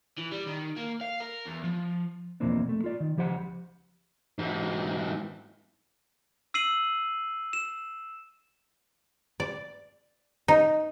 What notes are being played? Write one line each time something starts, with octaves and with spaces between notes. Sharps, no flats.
E3
G3
D#3
A#3
F5
A#4
E2
F3
E2 B2 F3 A#3 C4 D4
A3
F4 D5
D#3
C#2 F3 G4 C5 F#5
G#2 E3
E6 C7 D#7 F#7
E7
D5
D#4